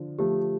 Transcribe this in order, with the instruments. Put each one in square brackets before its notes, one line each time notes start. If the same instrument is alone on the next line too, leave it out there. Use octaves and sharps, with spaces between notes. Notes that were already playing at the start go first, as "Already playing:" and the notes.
Already playing: [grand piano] D3 F3
[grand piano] F3 A3 [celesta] G4